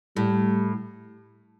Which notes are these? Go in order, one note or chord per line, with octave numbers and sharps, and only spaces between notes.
A2 G3